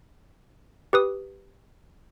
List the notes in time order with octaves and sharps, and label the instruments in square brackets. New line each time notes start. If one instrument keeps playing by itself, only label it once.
[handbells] G4 B4 D#6